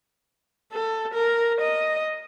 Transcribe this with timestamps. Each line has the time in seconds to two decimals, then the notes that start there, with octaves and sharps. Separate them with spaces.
0.72 A4
1.14 A#4
1.61 D#5